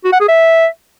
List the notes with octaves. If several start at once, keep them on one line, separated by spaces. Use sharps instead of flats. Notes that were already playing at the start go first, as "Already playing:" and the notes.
F#4
F#5
G#4
E5